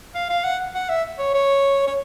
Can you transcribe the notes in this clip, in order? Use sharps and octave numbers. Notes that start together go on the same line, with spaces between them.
F5
F5
F#5
F#5
E5
C#5
C#5
C#5